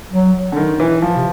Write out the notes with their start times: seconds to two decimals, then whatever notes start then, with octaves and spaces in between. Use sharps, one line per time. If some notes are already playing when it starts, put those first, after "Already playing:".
0.11 F#3
0.52 D3
0.57 D#3
0.80 E3
1.02 F3
1.16 C3